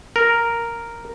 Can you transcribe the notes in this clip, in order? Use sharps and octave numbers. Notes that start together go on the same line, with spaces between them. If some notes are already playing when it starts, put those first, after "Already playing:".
A#4